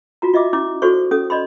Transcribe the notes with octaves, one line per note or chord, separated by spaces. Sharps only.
F4 F#4 A#5
F4 D#5 E5 D6
C#4 E4 D6
F#4 A4 C5 D5 C#6
C#4 A4 D#6
D5 D#5 B5 C6